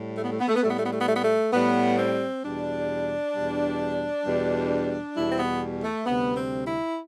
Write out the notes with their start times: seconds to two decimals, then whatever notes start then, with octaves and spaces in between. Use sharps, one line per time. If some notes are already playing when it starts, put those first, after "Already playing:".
Already playing: A2 G3
0.17 A3
0.24 B3
0.32 A3
0.40 B3
0.48 A3
0.55 B3
0.62 A2 G3 A3
0.70 B3
0.78 A3
0.86 B3
0.93 A3
1.01 B3
1.08 A3
1.16 B3
1.24 A3
1.53 A2 G3 B3
1.98 C4
2.43 E2 B2 G3 D4
3.34 E2 B2 G3
4.25 E2 B2 G3
5.16 E2 B2 G3 E4
5.31 C4
5.38 B3
5.83 A3
6.06 D2 C3 G3 B3
6.36 C4
6.67 E4